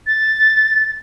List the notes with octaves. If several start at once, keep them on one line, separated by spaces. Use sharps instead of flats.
A6